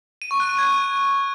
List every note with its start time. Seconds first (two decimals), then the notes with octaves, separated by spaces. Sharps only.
0.22 D#7
0.31 C#6
0.40 F#6
0.49 D#7
0.58 G#6